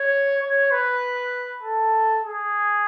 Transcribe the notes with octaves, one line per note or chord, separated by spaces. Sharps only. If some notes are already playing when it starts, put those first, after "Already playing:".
Already playing: C#5
C#5
B4
A4
G#4